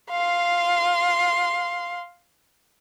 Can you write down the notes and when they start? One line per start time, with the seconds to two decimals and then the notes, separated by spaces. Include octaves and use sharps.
0.11 F5 C6